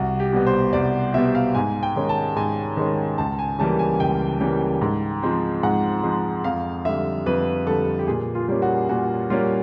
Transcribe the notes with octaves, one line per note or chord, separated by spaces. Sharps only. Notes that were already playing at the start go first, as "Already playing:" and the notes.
Already playing: C2 F#4
G4
B2 G3 B3
C5
C2 D5
B2 G3 B3 E5
F5
G#2 G#5
G5
D#3 G#3 C#4
A5
G#2 G#5
D#3 G#3 C#4
C#2 A5
G#5
C#3 E3 G3 A#3 A5
G#5
C#2 G5
C#3 E3 G3 A#3
G#2
F3 G#3 C4
G#2 F#5
F3 G#3 C4
F2 F5
D3 G3 E5
F2 B4
D3 G3 A4
G4
A#2 G#4
F4
G3 A#3 C#4
F#4
A#2 F#4
G3 A#3 C#4 F4